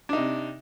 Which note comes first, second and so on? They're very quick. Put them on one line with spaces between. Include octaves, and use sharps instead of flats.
D4 D#4 C3